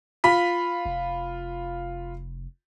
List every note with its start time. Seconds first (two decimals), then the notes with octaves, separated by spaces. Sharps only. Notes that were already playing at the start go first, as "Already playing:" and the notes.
0.24 F4 B5 B6
0.85 F1